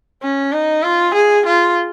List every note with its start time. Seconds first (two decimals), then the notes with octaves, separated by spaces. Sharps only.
0.23 C#4
0.53 D#4
0.83 F4
1.14 G#4
1.46 F4